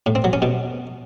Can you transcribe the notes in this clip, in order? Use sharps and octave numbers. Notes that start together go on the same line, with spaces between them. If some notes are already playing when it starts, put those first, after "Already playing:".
A2
C4
F#3
C#4
B2